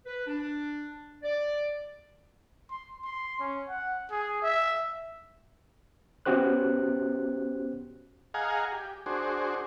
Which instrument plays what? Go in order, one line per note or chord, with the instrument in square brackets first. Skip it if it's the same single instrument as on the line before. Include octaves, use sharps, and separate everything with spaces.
[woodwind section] B4
D4
D5
[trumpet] C6
C6
C#4
F#5
G#4
E5
[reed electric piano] B3 C#4 F#4 G4 C5 F#6
[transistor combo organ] G#4 D#5 F5 F#5 G#5 A#5
G4
D4 F#4 G#4 C5